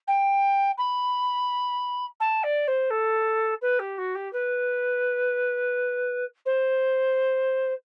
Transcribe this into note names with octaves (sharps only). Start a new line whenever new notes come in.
G5
B5
A5
D5
C5
A4
B4
G4
F#4
G4
B4
C5